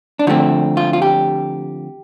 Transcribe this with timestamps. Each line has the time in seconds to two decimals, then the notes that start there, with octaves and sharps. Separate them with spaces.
0.19 D4
0.27 D3 F3 A3 C4 D#4
0.77 F4
0.93 F4
1.02 G4